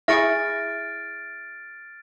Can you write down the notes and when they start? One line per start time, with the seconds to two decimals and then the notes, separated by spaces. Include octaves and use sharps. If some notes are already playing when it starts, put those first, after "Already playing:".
0.08 E4 G#4 E5 C#6 F6 A6 D7